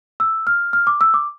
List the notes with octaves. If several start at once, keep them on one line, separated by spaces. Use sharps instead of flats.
E6
F6
F6
D6
E6
D6